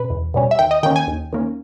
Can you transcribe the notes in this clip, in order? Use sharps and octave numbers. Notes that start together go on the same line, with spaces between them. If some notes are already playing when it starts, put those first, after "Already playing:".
Already playing: B2 C#4 B4
E2
B2 G3 C#4
E5
D#2 G5
D#5
D#3 A#3 C#4 G5
G#5
D#2
D#3 A#3 C#4